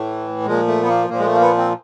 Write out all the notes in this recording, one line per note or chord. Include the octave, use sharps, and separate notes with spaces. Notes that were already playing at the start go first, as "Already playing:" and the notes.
Already playing: A2 E3 A3
A#2 F3 G#3
A3
B3
A#3
A#2 F3 A#3
G#3
A3
A#3
B3
C4